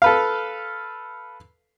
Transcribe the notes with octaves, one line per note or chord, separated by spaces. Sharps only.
A4 B4 F5